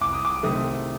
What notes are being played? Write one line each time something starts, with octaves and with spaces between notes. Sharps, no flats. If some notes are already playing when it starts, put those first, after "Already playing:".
C2 D6
D#6
D6
C3 D#3 A3 C4 D#6